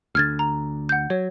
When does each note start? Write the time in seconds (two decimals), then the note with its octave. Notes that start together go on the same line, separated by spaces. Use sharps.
0.15 D2 D3 F6 G#6 A6
0.39 A#5
0.89 F#5 G6
1.10 F#3 C#5